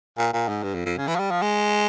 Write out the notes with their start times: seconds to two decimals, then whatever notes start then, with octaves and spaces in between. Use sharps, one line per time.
0.18 A#2
0.33 A#2
0.48 G#2
0.63 G2
0.75 F2
0.86 F2
0.97 C#3
1.08 E3
1.16 F3
1.19 G3
1.31 F3
1.42 G#3